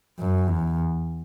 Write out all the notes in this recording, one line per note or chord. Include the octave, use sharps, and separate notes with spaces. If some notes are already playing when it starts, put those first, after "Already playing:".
F#2
E2